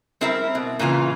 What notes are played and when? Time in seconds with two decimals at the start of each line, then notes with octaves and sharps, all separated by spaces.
0.21 G3 C4 E4 A#4 E5
0.55 B2
0.79 A#2 C#3 E3 F4